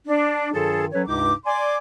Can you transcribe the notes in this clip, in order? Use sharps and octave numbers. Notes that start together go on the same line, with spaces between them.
D4
G2 D#3 F#3 F4 G#4 A4
F#3 C#4 A4 B4 C#5
C#2 G2 C3 D#4 D6
D5 G#5 C6 D6